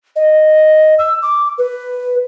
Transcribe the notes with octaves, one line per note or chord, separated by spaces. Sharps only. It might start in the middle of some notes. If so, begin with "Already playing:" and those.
D#5
E6
D6
B4